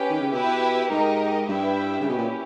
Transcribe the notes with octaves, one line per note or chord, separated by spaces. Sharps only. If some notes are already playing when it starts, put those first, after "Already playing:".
Already playing: C#4 G4 B4 G5
D#3
C#3
B2 E4 G4 B4
G#2 D#4 G4 A#4 D#5
G2 E4 G4 B4 E5 G5
C#3
B2 C#4 E4 G4 B4
A#2